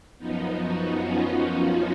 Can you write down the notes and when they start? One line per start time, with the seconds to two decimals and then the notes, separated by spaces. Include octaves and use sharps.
0.18 F#2 F3 B3 D#4
0.58 D#4 F#4
0.96 C#4 F4
1.36 B3 D#4